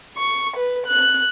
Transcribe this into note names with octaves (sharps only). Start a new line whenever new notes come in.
C#6
B4
F#6